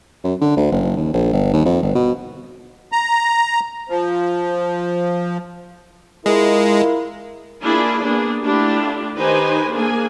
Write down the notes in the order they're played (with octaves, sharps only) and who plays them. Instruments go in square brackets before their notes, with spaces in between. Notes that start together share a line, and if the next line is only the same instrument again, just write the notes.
[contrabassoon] F#2
D3
D2
F#1
D#2
A#1
G1
D#2
F2
G1
B2
[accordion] A#5
F3
[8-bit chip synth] G#3 [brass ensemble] E4 F4 A#4
[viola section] A#3 D4 E4 F4 G#4 D5
A#3 B3 D4 G#4
A3 D4 E4 F4 G4
D#3 D#4 G4 B4 C5 G#5
A#3 D4 G#4 G#5